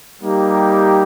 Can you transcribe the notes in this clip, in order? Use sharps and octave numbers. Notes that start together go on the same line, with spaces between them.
G3 A#3 D#4 G4